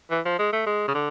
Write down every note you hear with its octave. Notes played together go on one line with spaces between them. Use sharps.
E3
F3
G#3
A3
G#3
C#3
D3